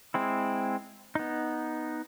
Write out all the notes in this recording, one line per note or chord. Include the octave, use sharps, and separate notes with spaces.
G#3 C4 E4
B3 D#4